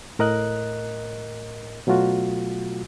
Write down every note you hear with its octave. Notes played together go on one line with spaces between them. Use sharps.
A2 A#4 D#5 F#6
B2 F#3 A3 F4 F#4